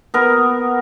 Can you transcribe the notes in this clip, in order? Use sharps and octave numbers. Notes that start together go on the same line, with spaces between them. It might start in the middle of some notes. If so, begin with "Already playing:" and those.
B3 A#4